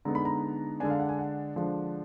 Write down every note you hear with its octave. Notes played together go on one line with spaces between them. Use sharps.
D3 G#3 B3 D#4 A#5
B5
A#5
D3 G#3 D4 G#5
F5
F#5
G#5
F#5
D3 F3 G#3 D4